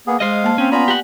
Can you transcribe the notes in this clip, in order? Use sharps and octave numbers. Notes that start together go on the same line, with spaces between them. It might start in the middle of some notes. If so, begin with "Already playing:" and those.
A#3 B3 G#4
G#3 C5 D#5 F5
A#3 A5
C4 C#4
B3 F4 D5 G#5 A#5 B5
G4 F#5